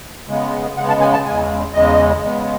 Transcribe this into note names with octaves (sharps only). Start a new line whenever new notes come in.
C#3 G#3 B3
C#3 G#3 B3 F#5
A5
G#5
A5
E2 C#3 G#3 G#5
E2 C#3 G#3 D#5
C#3 G#3 B3